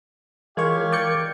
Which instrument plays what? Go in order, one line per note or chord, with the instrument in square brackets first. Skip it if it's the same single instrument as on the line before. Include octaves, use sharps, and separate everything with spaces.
[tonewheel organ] E3 A#4 G#6 [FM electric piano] G#3 F4 C#5 [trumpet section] G4 F5
[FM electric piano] D5 G5 C#7